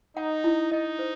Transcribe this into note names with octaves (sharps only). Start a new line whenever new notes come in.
D#4 F#5
E4
D#4 D#5
C5